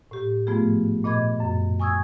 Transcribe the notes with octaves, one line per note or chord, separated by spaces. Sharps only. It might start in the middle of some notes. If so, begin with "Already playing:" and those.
A2 G4
G#2 F3 A3 B3 F4 G#4
A#2 D#5 B5 D6 G#6
F#2
G#5 C#6 D#6 E6 G#6